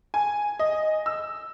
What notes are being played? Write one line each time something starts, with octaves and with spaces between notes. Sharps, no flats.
G#5
D#5
E6